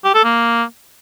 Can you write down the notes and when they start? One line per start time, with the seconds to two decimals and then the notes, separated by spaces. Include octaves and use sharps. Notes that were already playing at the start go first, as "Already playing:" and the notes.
0.04 G4
0.14 A4
0.25 A#3